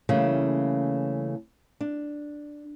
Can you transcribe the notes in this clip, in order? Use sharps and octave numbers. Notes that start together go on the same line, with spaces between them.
C#3 E3 G3 A3 A#3 C#4
D4